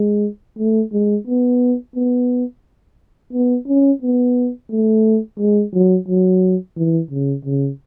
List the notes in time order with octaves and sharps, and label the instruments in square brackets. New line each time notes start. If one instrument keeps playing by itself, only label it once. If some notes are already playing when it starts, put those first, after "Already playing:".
Already playing: [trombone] G#3
A3
G#3
B3
B3
B3
C#4
B3
A3
G#3
F#3
F#3
E3
C#3
C#3